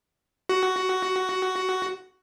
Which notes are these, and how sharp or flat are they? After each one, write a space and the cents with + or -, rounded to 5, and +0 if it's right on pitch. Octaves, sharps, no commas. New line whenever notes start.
F#4 +10